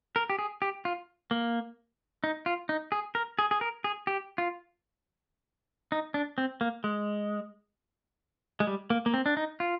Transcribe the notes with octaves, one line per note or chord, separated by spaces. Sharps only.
A#4
G4
G#4
G4
F4
A#3
D#4
F4
D#4
G#4
A#4
G#4
G#4
A#4
G#4
G4
F4
D#4
D4
C4
A#3
G#3
G#3
G3
A#3
A#3
C4
D4
D#4
F4